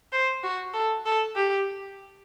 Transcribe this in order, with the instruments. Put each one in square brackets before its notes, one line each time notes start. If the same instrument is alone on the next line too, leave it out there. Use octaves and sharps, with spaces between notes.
[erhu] C5
F#4
A4
A4
G4